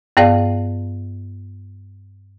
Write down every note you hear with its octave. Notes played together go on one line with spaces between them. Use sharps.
G2 B3 G#4 D5 F5